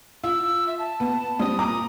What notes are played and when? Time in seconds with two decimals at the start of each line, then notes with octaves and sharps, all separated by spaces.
0.24 F4 E6
0.67 E5
0.79 A5
1.00 B3
1.39 G3 C4 D#6
1.59 A#2 A#5 D6